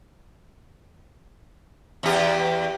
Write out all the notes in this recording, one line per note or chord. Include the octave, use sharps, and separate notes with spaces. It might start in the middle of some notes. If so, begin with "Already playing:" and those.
E2 G4